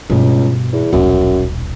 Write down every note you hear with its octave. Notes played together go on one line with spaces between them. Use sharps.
C#2 G2 B2
E2
D#1 B1 F#2